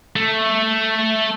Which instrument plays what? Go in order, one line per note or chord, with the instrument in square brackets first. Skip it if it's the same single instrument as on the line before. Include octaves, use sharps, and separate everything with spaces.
[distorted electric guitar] A3